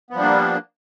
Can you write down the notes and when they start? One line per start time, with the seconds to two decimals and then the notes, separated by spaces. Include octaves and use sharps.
0.11 B3
0.13 F3
0.16 G3
0.19 D4
0.22 A#3